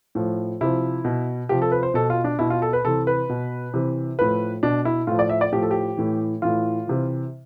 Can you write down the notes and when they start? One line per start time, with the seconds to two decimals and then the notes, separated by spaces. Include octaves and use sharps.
0.15 A2 F3
0.61 C3 F3 E4
1.05 B2
1.49 C3 F3 G4
1.62 A4
1.72 B4
1.83 C5
1.94 B2 A4
2.10 F4
2.24 D4
2.39 B2 E4
2.50 F4
2.62 A4
2.73 B4
2.84 C3 E3 A4
3.07 B4
3.29 B2
3.74 C3 E3
4.19 A2 F3 B4
4.63 B2 D4
4.85 E4
5.07 A2 F3 F4
5.19 D5
5.29 E5
5.41 D5
5.52 A2 F3 G4
5.62 A4
5.71 G4
5.97 A2 E3
6.42 A2 E3 F4
6.87 C3 E3